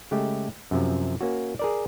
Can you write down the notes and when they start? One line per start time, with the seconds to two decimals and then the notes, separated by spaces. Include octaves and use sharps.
0.11 C#3 G#3 A3 G4
0.71 F#2 C3 F3
1.21 A#3 C#4 F#4
1.59 G#4 A#4 D5